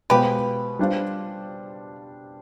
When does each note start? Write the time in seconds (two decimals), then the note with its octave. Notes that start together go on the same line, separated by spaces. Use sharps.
0.10 B2 G#3 B3 F4 G4 B4 C5
0.79 G3 D4 F4 C5